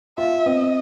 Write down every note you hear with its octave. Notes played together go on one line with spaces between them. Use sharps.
F4 E5
C4 D#5